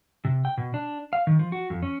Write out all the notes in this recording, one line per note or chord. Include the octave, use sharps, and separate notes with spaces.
C3
G5
B2
D4
F5
D#3
F3
F#4
F2
C#4